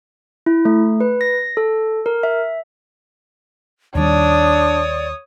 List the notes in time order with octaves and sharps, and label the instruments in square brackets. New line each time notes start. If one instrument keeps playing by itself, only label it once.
[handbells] E4
A3
B4
A#6
A4
A#4
E5
[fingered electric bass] D#2 D#3 G3 [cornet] D4 [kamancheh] C#5 D#6 [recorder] D5